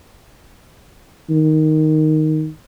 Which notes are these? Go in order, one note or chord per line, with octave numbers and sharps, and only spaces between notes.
D#3